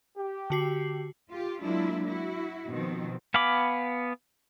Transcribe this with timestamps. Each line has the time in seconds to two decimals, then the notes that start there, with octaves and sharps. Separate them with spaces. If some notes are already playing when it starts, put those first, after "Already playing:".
0.16 G4
0.50 D3 F#4 C7
1.30 F4 G4
1.60 F#3 G#3 A#3 D4 E4 F4
2.07 E4 F#4
2.69 B2 D#3 F3 C4
3.34 B3 F5 G#5 B5 D6